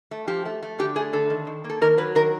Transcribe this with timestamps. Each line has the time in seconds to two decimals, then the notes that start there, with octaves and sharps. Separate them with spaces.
0.11 A3
0.27 F3 G4
0.45 A3
0.63 A3
0.78 D3 G4
0.96 A3 G#4
1.13 D3 A4
1.30 D#3
1.47 D#3
1.64 A#3
1.70 A4
1.81 D#3 A#4
1.98 F#3 B4
2.15 D#3 A#4